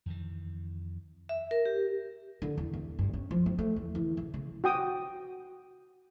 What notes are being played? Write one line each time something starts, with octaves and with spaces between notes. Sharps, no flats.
F2 D#3 E3
E5
A#4
G4
D3
E2
E2
G2
C#4
F3
C4
A3
E2
E3
C#3
C#3
F#4 G5 D#6